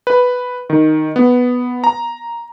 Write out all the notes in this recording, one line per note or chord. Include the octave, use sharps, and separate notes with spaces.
B4
D#3
B3
A#5